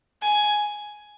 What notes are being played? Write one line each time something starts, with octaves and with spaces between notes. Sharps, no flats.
G#5